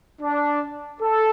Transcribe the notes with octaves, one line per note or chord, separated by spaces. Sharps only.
D4
A4